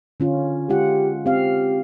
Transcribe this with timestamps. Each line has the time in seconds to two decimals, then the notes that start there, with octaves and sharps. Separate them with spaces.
0.20 D3 C#4 F4
0.69 G#3 F4 G4 F#5
1.26 C4 G4 F5